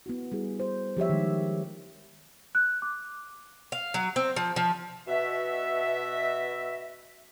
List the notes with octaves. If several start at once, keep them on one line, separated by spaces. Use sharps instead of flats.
B3 E4 F#4
G3 E4 G#4
C5
F3 G4 C#5 E5
D#3 G#3
F#6
D6
F5
F#3
C4
F3
F3
B2 F#4 E5